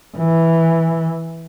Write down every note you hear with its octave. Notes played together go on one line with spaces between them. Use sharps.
E3